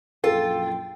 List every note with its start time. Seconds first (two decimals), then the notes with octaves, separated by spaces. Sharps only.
0.24 A#1 F#2 F4 A4 G5